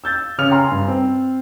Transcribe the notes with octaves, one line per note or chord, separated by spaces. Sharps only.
E6 G6 A6
C#3 C#5 F6 F7
G#5 A#5 C6
G2
C4